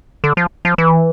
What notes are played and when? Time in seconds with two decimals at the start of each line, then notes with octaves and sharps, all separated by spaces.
0.24 D3
0.37 F3
0.65 F3
0.78 E3